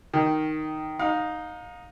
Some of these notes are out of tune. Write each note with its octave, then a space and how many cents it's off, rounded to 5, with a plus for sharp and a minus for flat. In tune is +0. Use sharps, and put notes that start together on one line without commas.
D#3 +0 G5 +0
D#4 +0 F5 +35